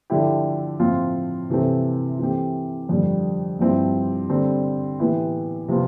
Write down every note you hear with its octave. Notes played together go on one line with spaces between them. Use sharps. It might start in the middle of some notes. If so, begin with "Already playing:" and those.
D3 F3 A3 E4 G4
A2 F3 C4 F4
C3 E3 A3 C4
E3 A3 C4 G4
F2 D3 G3
G2 F3 C4 E4 G4
D3 G3 C4
A2 E3 B3 E4 G4
C3 F3 B3 F4